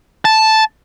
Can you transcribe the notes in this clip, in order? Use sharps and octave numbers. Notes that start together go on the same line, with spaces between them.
A5